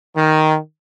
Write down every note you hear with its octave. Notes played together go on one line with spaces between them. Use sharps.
D#3